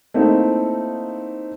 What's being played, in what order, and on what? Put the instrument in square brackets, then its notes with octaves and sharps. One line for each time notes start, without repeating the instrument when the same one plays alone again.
[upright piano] A3 A#3 C4 D#4 E4